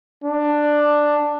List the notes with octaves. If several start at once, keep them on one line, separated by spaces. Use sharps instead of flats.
D4